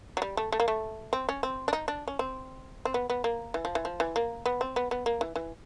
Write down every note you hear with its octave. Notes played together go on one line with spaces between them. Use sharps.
F#3
G3
A3
A3
A#3
A3
C4
C#4
C4
D4
D#4
D4
C#4
C4
C4
B3
B3
A#3
E3
F3
E3
F3
E3
A#3
B3
C4
B3
B3
A#3
E3
E3